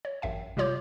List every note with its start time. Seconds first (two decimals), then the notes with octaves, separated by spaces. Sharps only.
0.05 C#5
0.22 A1 F#2 E5 G5
0.57 C3 G3 F4 C#5 D6 G6